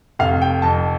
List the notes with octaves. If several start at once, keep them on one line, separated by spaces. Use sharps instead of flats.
F1 F5
G5
F2 A5